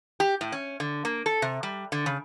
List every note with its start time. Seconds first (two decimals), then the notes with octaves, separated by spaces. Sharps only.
0.20 G4
0.41 A2
0.52 C#4
0.80 D3
1.05 A#3
1.26 A4
1.42 C3
1.63 G3
1.92 D3
2.06 C#3